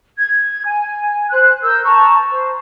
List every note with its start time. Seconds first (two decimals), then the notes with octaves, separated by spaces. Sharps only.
0.17 G#6
0.65 G#5
1.30 C5 F#6
1.63 A#4 E6 G6
1.84 A5 A#5 C#6
2.32 C5